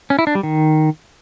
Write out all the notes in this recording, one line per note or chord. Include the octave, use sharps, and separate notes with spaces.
C#4
E4
D4
G3
D#3